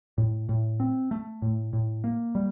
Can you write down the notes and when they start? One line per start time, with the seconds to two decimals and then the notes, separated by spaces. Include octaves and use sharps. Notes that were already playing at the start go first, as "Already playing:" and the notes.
0.18 A2
0.49 A2
0.80 C4
1.11 A3
1.42 A2
1.73 A2
2.04 A#3
2.35 G3